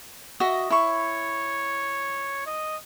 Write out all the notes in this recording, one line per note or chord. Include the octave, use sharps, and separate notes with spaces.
F#4 D#5 E5
E4 C#5 C#6
D#5